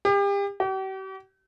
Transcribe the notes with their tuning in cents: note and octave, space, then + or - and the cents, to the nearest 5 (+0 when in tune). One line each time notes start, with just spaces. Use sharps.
G4 +35
G4 -45